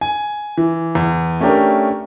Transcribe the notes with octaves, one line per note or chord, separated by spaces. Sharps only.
G#5
E3
E2
A3 C#4 D4 G4 A#4